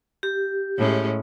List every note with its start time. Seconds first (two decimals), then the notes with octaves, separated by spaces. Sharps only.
0.23 G4
0.78 A2 G#3 C#4